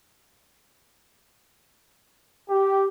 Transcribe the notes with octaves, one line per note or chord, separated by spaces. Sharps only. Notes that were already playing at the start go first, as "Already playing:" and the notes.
G4